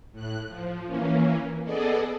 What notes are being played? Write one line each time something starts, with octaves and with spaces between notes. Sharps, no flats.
A2 F#6
F3
E3 A#3 C#4
B3 G#4 A4 D5 D#5